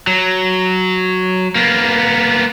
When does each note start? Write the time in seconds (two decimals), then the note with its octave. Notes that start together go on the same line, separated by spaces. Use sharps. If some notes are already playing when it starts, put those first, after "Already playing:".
0.07 F#3
1.55 A#3 B3